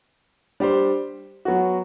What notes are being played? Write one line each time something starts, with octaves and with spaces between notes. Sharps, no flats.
G3 D4 G4 C5
F#3 B3 F#4